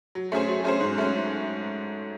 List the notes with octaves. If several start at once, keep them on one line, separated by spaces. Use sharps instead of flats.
F#3
A3 C#4 G#4 C5
F#3
A3 C#4 G#4 C5
G#2
F#3 A3 C#4